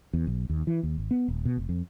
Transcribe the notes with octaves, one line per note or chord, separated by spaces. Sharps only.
E2
B1
D#2
E3
D#2
G#1
B3
D#1
B2
F1
F2